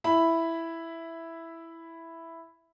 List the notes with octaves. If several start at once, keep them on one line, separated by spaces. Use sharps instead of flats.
E4 B5